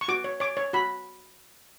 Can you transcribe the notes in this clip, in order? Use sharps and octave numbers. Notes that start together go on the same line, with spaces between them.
C#6
F#4 D6
C#5
C#5 D6
C#5
F#4 B5